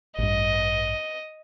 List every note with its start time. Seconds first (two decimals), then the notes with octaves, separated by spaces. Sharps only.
0.18 A1 G2 D#5